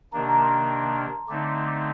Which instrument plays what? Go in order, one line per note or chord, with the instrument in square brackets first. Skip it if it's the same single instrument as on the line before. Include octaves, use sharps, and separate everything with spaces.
[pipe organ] C3 D#3 A#3 D4 [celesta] A#5
[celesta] A5
A#5
C6
[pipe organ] D3 A3 C4 D#4 [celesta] D6
[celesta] D6
C6
D6